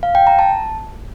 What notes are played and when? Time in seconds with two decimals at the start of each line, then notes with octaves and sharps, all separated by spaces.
0.03 F5
0.15 G5
0.27 A#5
0.39 A5